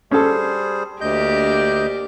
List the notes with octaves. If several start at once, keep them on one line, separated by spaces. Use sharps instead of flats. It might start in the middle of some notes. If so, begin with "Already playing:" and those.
G3 C#4 G#4 A4 C5
D2 A#3 D4 G4 D#5 G6